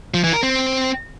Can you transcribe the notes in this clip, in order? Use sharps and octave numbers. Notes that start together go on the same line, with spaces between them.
F3
E3
A#4
C4